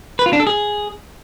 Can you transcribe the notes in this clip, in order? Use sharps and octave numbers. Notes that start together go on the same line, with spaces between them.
B4
F4
D4
A4
G#4